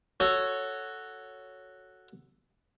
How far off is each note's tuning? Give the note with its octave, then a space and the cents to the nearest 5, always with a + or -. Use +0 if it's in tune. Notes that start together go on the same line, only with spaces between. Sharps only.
F#4 +0 A4 +0 C#5 +0